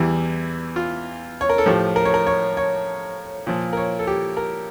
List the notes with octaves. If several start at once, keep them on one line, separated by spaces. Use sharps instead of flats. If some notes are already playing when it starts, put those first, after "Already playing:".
Already playing: E2 E3 G3 G4
F4
C#5
A#4
A4
A2 F3 G4
A#4
C#5
A#4
C#5
C#5
A#2 F3
A#4
C#5
A4
G4
A#4